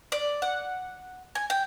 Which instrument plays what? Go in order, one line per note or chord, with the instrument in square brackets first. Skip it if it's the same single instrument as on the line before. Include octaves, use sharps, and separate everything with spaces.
[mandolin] D5
F#5
G#5
G5